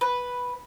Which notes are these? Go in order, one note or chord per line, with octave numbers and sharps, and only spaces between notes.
B4